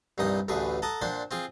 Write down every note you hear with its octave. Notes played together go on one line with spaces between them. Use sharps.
C2 G2 A#2 D#4 D#6
A1 D2 A2 G#4 B4
A4 F#5 A5 A#5 D#6
A#2 D4 C5 F#5
C4 F4 G#4